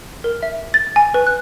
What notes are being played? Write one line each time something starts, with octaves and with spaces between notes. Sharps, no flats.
A#4
E5
A6
G#5
B4
F#6